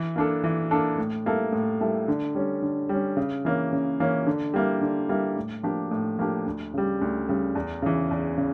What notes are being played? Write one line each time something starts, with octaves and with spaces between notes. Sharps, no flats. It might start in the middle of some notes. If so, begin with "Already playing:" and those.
Already playing: E3
A#3 D4 A4
E3
A#3 D4 A4
A2
G3 A#3 E4 A4
A2
G3 A#3 E4 A4
D3
G3 C#4
D3
G3 C#4
C#3
E3 A#3 C#4
C#3
E3 A#3 C#4
D3
G3 A#3 E4
D3
G3 A#3 E4
A2
F3 A#3 D4 G4
A2
F3 A#3 D4 G4
D2
C#3 G3
D2
C#3 G3
E2
C#3 E3
E2
C#3